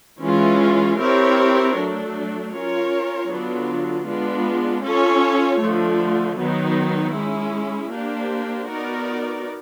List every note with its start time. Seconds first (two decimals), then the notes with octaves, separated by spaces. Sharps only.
0.22 E3 G#3 C#4 F4
1.00 C4 E4 G4 A#4 C#5
1.76 F#3 A3 D4
2.53 C#4 F4 A#4 C#5
3.31 D3 F#3 B3 D4 F4
4.07 G#3 B3 D4 F4
4.84 C#4 F4 A4 C#5
5.62 D3 F3 A3
6.39 D#3 F#3 B3 D#4
7.16 G#3 C#4 E4
7.92 A#3 D4 G4 C5
8.70 B3 D#4 F#4 A#4 D5